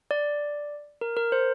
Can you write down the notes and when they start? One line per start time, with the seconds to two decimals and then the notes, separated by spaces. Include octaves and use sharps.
0.11 D5
1.01 A#4
1.17 A#4
1.32 C5